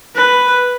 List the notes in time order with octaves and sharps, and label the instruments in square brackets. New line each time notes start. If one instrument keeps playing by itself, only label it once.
[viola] B4